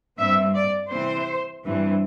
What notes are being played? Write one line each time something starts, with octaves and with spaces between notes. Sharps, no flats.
G2 G3 C4 E5
D5
C3 E3 C4 C5
G2 E3 C4